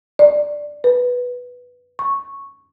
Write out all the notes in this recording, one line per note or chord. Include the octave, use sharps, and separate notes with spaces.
D5
B4
C#6